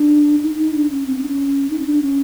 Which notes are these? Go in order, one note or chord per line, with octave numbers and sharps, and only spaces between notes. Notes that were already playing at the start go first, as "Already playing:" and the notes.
Already playing: D4
D#4
D#4
D4
C#4
C4
C4
D4
C#4
D#4
C#4
D4
C#4